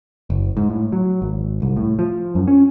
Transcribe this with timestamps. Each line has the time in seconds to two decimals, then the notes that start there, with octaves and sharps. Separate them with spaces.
0.30 F#1
0.57 G#2
0.70 A2
0.92 F#3
1.22 G#1
1.62 C2
1.77 A2
1.99 F3
2.35 F#2
2.48 C#4